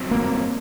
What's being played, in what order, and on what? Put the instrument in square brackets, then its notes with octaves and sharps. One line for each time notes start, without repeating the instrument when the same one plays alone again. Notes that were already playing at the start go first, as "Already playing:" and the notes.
Already playing: [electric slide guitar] G2 F#3 C4
[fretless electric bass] A#3